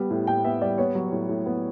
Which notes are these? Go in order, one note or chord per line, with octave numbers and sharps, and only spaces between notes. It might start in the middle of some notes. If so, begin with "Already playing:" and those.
Already playing: G3 B3
A2
A2 G5
B3 E5
G3 D5
B3 C#5
F#3
A2
A2
B3